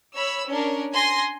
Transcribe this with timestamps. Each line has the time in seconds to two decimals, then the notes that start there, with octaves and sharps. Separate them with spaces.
0.16 C#5 B5 E6
0.49 C#4 D4 A#4
0.93 G#5 C6 A#6 C7